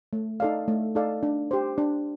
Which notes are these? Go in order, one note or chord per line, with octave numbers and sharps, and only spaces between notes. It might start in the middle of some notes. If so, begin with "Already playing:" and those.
A3
D#4 A4 D5 F5
A3
D#4 A4 D5 F5
D4
G4 C5
D4